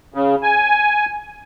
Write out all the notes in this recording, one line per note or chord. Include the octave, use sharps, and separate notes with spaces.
C#3
G#5